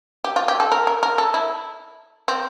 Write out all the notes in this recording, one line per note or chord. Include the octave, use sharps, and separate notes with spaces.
G4
F4
G4
A4
A#4
A#4
A#4
A4
E4
C4